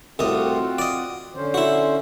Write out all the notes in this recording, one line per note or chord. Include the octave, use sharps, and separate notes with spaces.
C2 A2 C4 F4 F#4 D#5
D5 D#5
D3 C#4 C5
E4 F#4